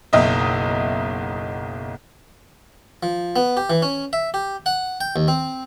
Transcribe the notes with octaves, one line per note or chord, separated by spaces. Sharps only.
F#1 B1 D#5 E5
F3
B3
G4
E3
C#4
E5
G4
F#5
G5
D#2
C4